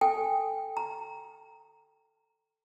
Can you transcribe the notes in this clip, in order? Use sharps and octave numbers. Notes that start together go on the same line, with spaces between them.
A4 G5 G#5
A#5